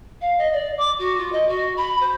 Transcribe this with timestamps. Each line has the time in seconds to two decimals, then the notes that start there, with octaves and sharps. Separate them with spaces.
0.21 F5
0.38 D#5
0.53 D5
0.78 D6
0.99 F#4
1.18 F4
1.32 D#5
1.48 F#4
1.77 B5
2.01 C5